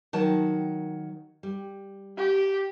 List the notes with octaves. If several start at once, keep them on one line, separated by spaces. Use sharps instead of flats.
D#3 F#3 A5
G3
G4